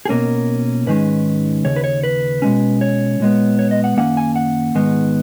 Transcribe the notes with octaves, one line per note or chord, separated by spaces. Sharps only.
G#4
B1 B2 A#3 C#4 A#4
G#2 D#3 G#3 C#4 B4
D#2 C#3 C#5
B4
C#5
B4
B2 G#3 C#4
C#5
A#2 G#3 B3
C#5
D#5
F#5
F#2 D#3 A#3 C#4 F#5
G#5
F#5
G#2 D#3 G#3 B3